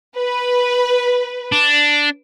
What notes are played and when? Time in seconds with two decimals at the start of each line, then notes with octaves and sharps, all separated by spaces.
0.17 B4
1.52 D4